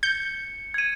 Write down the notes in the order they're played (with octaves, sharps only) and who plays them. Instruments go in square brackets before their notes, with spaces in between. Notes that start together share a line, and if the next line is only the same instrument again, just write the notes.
[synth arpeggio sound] G6 [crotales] C#7
[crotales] G#6 D#7